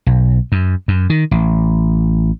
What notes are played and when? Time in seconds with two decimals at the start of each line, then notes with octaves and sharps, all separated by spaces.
0.06 B1
0.52 F#2
0.88 F#2
1.10 D#3
1.31 A1